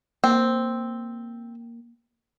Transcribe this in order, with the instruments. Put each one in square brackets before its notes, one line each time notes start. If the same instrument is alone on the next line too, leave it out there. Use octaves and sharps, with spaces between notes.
[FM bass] A#3 [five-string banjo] C4